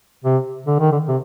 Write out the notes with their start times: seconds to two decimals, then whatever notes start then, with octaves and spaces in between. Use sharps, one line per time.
0.24 C3
0.66 D3
0.80 D#3
0.92 D3
1.08 C3